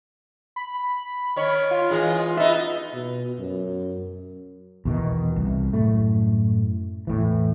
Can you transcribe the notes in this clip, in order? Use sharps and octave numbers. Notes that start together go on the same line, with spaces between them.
B5
D#3 C#5
F4
E3 G#3 D#4
B3 D#4 E5
B2
F#2
E2 B2 D#3
C2
F#2 A2 A3
E2 A2 E3